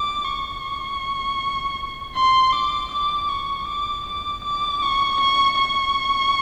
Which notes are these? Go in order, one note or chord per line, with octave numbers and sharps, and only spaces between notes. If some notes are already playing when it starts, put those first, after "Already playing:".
Already playing: D6
C#6
C6
D6
D6
C#6
D6
D6
D6
C#6
C#6
C#6